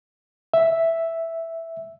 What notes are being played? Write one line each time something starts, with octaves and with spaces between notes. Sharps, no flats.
E5